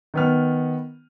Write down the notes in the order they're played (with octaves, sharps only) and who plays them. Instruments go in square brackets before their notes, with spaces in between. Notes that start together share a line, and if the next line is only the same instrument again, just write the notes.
[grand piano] D#3 B3 F6